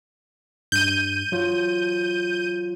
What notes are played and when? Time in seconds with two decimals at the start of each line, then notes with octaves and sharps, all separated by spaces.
0.72 G2 G6 D#7
1.32 F#3 F4